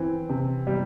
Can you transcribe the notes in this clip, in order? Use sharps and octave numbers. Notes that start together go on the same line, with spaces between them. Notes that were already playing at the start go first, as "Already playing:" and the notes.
Already playing: E3 C4
C3
G3